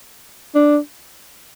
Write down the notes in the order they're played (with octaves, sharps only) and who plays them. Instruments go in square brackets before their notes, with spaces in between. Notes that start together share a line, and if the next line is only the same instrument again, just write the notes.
[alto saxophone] D4